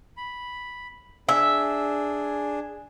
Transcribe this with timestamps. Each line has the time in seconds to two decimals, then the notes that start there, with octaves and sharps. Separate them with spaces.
0.17 B5
1.29 D4 G#4 E5